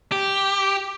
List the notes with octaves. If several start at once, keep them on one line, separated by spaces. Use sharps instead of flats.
G4